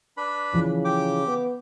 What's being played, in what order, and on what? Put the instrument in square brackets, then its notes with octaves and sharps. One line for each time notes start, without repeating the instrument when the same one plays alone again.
[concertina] D4 B4 B5
[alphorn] C#3 [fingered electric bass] E3 F3
[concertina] G4 G5 D6
[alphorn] B3